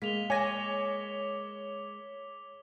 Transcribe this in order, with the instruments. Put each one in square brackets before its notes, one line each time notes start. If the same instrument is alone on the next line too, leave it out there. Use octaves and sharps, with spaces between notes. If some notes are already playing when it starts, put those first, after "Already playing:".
[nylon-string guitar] G#3 A#3 [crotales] B6 F7 G7
[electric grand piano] C#5 A#6 [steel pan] G#5 [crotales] D6